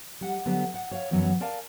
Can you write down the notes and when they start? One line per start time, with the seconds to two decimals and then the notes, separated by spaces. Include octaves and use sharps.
0.21 G3 F#5
0.46 D3 F#3 G3 B3
0.74 F#5
0.91 C#5 F5
1.11 F#2 E3 F#3 B3 C#5
1.40 A#4 D5 F5 G#5 A5